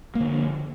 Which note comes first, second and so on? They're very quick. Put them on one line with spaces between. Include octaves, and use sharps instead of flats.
A#3 D3 F3